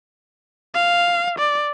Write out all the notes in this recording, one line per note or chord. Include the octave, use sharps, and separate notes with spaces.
F5
D5